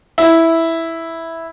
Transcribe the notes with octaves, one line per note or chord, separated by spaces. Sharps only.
E4